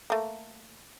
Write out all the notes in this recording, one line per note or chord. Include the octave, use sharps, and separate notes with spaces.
A3 A#3